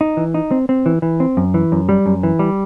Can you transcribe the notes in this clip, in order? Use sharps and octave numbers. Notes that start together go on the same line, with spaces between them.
D#4
E3
D#4
C4
C4
E3
E3
C4
F#2
E3
F#2
G3
F#2
E3
G3